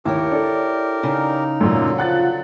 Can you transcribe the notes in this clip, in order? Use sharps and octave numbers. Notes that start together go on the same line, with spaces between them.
D#2 E4 G4 A#4 C#5
D4 A4 D5
C#3 D#4
F#2 A#2 D3 F#3
F3 F#5 F#6 A6